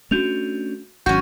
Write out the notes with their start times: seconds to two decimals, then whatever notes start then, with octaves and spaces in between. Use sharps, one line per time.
0.11 A3 C#4 D4 F#4 G6 F7
1.06 G#1 C#3 F#3 C#4 F#4 G6